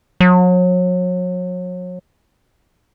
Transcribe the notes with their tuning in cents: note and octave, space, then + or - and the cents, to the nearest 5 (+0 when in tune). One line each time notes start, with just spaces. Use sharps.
F#3 -35